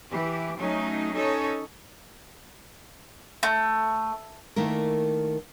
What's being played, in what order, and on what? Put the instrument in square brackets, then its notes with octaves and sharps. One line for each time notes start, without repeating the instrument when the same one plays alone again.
[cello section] E3 G4
F#3 A3 C#4 D#4
C#4 D#4 A4 C#5
[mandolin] A3
[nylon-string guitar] D#3 A3 A#3 E4 A#4